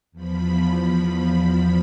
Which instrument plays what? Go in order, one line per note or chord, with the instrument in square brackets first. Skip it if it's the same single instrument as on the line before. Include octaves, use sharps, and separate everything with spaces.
[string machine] E2 F3 B5